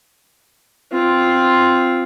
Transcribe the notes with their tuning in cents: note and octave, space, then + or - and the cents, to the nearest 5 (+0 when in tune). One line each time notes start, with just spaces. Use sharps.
C4 +0 F4 +0